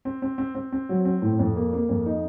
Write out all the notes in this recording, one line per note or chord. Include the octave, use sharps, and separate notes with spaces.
C4
C4
C4
C4
C4
F#3
C4
A2
F2
A#3
A#3
F2
D#4